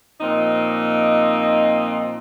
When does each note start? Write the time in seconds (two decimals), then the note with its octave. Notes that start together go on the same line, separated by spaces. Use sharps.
0.21 A#2 F3 C4 D#4 D#5